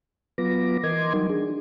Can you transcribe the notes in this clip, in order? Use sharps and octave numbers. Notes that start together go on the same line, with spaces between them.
F#3 B3 F4 B4 D6 A#6
E3 A#4 D#5 C6 D6 G#6
F#3 G3 D#4
D4 G#4